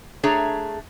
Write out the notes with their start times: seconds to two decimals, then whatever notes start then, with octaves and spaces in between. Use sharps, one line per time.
0.23 A3 D4 G#4 C#5 A#5